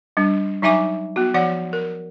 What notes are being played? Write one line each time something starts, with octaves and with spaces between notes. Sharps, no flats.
G3 D4
F#3 D#4 E5 G#5 D6
B3 F#4
F3 D5 F#5
A#4